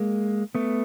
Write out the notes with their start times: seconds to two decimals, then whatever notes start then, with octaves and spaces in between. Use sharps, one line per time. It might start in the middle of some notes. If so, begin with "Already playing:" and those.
Already playing: G#3 A#3
0.55 A3 B3